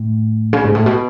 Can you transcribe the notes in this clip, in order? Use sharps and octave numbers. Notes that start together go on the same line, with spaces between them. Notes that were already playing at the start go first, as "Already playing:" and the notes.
Already playing: A2
C#3
G#2
A2
B2